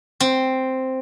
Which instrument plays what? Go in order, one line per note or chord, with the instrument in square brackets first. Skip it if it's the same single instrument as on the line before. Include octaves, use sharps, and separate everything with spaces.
[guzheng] C4